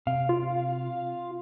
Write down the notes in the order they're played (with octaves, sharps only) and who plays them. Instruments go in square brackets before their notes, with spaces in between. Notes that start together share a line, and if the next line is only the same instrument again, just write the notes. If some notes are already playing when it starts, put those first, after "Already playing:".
[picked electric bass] C3 [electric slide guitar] F5
[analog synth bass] F4